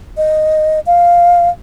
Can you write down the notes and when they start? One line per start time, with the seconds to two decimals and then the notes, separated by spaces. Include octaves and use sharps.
0.17 D#5
0.87 F5